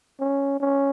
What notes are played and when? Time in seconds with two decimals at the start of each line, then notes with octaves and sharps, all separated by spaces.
0.20 C#4
0.61 C#4